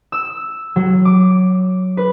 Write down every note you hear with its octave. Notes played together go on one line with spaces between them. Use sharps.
E6
F#3
D6
B4